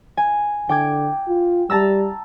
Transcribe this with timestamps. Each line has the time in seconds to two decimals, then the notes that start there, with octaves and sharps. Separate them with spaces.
0.17 G#5
0.69 D3 G5 D6 G#6
1.28 F4
1.70 G3 A5 A#5 E6